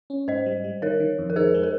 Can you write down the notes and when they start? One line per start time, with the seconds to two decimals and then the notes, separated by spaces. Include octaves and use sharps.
0.10 C#4
0.28 G#2 C5 D#5
0.46 G3
0.64 G3
0.82 D#3 A#4 C#5
1.00 D#3
1.18 F2
1.30 A#4
1.36 D#4 G#4 C5
1.54 G#3
1.63 A#4